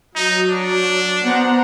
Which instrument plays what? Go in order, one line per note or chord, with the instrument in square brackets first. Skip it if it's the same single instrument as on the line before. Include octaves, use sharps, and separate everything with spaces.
[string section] F#3 [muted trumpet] D#4
[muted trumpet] D4
[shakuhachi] B3 [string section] C5 F#5 A#5